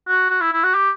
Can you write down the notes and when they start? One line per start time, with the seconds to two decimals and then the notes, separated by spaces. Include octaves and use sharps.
0.08 F#4
0.30 F#4
0.41 E4
0.53 E4
0.64 F#4
0.74 G4